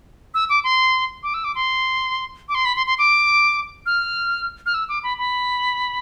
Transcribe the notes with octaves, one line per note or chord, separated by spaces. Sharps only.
E6
D6
C6
D6
E6
D6
C6
D6
C6
B5
C6
C6
D6
F6
F6
E6
D6
B5
B5